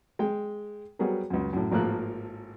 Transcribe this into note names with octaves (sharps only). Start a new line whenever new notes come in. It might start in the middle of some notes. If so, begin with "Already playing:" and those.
G#3 G5
F#3 G3 B3 F#4 G#4 A#4
C#2 F#2
F#2 A2
G#1 A2 F3 A#3 G#4 F#6